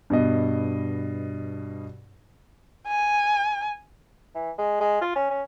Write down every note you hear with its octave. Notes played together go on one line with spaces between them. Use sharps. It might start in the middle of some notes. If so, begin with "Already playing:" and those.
G2 B2 D#5
G#5
E3
G#3
G#3
F4
C#4
C#4